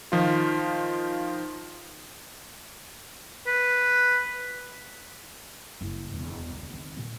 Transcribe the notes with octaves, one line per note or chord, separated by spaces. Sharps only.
D#3 F3 F4
B4
F#1 E4
E1 E2
D2
D#3 C4
A#2